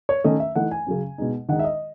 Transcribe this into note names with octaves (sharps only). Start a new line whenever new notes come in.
C#5
D#3 A3 C#4 D#5
E5
E3 A3 D#4 F#5
G#5
C#3 F#3 C#4
B2 G#3 D#4
D#3 G#3 D#4 F#5
E5
D#5